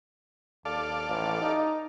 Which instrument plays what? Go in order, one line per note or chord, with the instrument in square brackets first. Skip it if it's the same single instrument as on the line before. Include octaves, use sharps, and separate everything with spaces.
[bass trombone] D#2 [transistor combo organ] A4 D5 F5
[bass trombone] A1
D#4